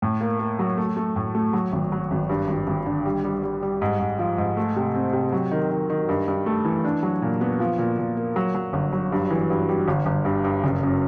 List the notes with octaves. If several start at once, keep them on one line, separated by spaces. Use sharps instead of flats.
A2
A#3
A#3
F#3
A3
A3
A2
A3
F#3
G#1
F#3
G#1
G2
G#1
G#1
D3
G3
G3
G3
G3
G#2
G#2
F3
G#2
A3
C3
C4
C3
F#3
D#3
D#3
D#3
G2
G2
A3
E3
D4
F#3
A#2
B3
F3
A#2
A#2
A#3
F#3
F#3
G1
F#3
G2
E3
G2
G3
G1
G1
G2
G2
F#1
F#2